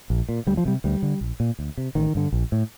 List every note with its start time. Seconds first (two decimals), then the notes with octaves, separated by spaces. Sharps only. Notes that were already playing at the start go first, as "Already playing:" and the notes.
0.10 A#1
0.29 A#2
0.47 D2 G3
0.57 F3
0.65 C3 G3
0.84 D2 G3
1.02 D3
1.21 A#1
1.40 A#2
1.59 D2
1.77 C3
1.95 A1 D#3
2.15 G2 D3
2.32 A#1
2.52 A2